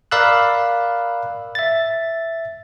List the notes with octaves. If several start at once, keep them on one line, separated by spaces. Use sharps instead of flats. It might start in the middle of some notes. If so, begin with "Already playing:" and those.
A#4 D5 F5 B5 E6 F#6
E5 A6